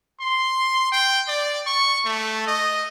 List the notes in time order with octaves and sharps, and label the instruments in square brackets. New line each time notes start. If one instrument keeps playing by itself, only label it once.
[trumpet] C6
G5
D5
C#6
A3
D#5